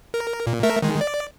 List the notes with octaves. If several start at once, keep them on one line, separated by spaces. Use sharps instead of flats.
A#4
A#2
A3 A#4 E5
D#3 G#3
D5